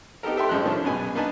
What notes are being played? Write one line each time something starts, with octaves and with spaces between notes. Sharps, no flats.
B3 D#4 G4 A4 A#4
G4 A4 E5 G5 C6
A1 F#2 F3 G#3 F#6
D#3 A3 C#4 D4
A#1 F#2 B2 F#3 B4 G#5
A#3 D4 D#4 B4 G#5 A5